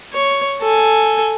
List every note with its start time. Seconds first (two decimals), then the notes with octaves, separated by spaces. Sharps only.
0.13 C#5
0.62 A4 G#5